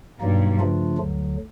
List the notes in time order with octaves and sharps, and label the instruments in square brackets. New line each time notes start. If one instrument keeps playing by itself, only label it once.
[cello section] G2 [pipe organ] B2 F#3 A#3 D#4
[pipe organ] C#3 F3 A3 D4 F4
D2 D3 F#3